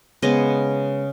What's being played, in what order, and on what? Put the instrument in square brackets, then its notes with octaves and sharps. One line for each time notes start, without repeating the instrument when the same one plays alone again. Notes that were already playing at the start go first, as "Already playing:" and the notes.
[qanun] C#3 G#3 B3 D#5